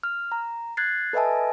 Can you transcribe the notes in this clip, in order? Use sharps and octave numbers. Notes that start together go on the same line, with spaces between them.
F6
A#5
F#6 G#6 A6 C7
A4 B4 D#5 E5 G#5 A5